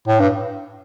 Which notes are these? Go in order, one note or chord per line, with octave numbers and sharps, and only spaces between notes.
A2
G2